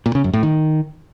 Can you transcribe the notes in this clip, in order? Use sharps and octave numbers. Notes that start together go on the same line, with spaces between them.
A#2
C#3
F#2
A2
D#3